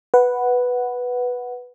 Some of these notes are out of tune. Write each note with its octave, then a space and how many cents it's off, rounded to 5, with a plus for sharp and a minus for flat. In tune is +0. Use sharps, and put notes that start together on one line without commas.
B4 +0 F#5 +0